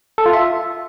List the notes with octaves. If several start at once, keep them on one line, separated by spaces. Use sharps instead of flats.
A4
F4
E5